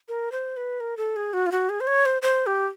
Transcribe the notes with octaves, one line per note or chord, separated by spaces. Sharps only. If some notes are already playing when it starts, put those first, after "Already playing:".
A#4
C5
B4
A#4
A4
G#4
F#4
F4
F#4
G#4
C5
C#5
C5
C5
G4